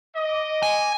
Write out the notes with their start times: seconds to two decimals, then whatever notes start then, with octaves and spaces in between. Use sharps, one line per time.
0.16 D#5 D6
0.63 G#5